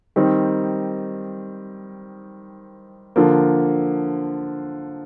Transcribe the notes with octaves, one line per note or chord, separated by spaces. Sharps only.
D#3 G3 C4 D#4
D3 F3 A#3